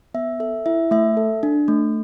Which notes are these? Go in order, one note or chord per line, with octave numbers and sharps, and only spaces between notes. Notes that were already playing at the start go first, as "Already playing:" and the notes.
B3 E5
A4 E5
E4 E5
A3 E5
A4
D4
A3